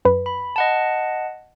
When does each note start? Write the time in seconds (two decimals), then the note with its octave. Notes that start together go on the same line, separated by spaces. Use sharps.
0.05 F#2 B4
0.26 B5
0.56 D#5 F#5 A5